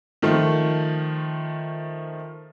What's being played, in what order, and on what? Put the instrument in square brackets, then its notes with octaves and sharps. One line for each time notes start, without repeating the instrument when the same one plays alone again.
[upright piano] D#3 F3 A3 F4